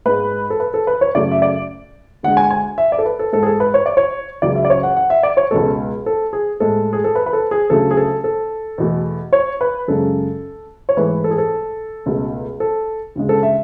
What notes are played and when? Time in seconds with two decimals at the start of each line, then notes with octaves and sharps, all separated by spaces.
0.05 G#2 G#3 B4
0.50 A4
0.60 B4
0.74 A4
0.87 B4
1.01 C#5
1.15 F#2 C#3 F#3 A3 D5
1.31 E5
1.42 D5
2.23 D2 D3 G#3 F#5
2.37 G#5
2.50 G#5
2.78 E5
2.92 D5
2.99 A4
3.06 B4
3.19 A4
3.33 G#2 G#3 A4
3.43 G#4
3.46 A4
3.60 B4
3.74 C#5
3.86 D5
3.97 C#5
4.42 C#2 C#3 F#3 D5
4.55 E5
4.65 D5
4.70 C#5
4.83 F#5
4.97 F#5
5.10 E5
5.23 D5
5.37 C#5
5.51 C#2 B2 G#3 A4
6.06 A4
6.33 G#4
6.60 A2 G#3 A4
6.93 G#4
7.04 A4
7.15 B4
7.26 B4
7.33 A4
7.51 G#4
7.70 D2 C#3 F#3 A3 A4
7.91 G#4
7.97 A4
8.24 A4
8.78 E2 B2 A3
9.33 C#5
9.61 B4
9.88 F#2 C#3 G#3 A4
10.89 C#5
10.97 G#2 E3 A3 B4
11.24 A4
11.31 G#4
11.38 A4
12.06 C#2 B2 A3
12.60 A4
13.15 D2 C#3 G#3
13.29 A4
13.43 E5